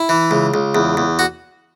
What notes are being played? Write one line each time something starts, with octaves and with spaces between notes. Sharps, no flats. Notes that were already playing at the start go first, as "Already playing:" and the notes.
Already playing: E4
E3
C#2
C#2
E2
E2
F#4